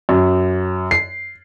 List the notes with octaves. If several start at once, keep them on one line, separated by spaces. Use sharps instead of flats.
F#2
C7